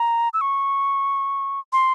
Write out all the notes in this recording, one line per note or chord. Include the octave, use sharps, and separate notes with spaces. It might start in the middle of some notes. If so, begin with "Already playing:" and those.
Already playing: A#5
E6
C#6
C6